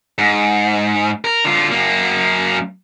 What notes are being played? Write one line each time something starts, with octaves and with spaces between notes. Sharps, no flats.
G#2
A#4
D3 F4
F#2 A#3